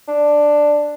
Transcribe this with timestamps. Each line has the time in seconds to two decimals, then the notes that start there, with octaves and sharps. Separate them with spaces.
0.08 D4